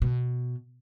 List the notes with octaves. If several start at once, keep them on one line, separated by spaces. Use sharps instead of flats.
B2